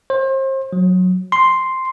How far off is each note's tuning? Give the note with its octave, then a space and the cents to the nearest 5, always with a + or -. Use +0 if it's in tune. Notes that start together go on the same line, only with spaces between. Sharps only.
C5 +35
F#3 -15
C6 +0